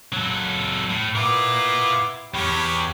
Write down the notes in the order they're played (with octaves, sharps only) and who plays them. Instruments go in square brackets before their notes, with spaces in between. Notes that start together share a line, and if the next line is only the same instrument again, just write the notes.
[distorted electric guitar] F#3 A4
A2
[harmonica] B3 E4 D6 [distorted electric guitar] F4 A#4
[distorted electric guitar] E2 [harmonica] G4 C#5 B5